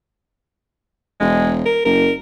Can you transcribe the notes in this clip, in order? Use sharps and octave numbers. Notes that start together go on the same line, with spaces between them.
E1 G#3
A#4
F#1 A#4